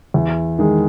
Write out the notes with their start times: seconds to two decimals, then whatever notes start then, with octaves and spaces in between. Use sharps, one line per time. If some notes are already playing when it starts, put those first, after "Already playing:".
0.14 E2
0.59 D#3 G#3